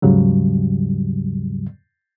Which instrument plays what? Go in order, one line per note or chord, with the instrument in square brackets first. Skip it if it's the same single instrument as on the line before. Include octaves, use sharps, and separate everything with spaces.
[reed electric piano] D#2 G#2 C#3 F#3 G3